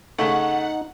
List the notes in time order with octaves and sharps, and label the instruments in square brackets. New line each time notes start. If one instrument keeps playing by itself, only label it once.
[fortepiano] C#3 A3 [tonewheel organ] D#4 [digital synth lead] F#5